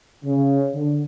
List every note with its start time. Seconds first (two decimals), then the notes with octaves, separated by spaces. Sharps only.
0.24 C#3
0.74 D3